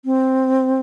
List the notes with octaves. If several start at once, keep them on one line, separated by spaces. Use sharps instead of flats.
C4